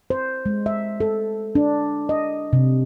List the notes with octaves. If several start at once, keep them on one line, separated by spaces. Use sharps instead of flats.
C5
G#3
E5
A4
D4
D#5
C3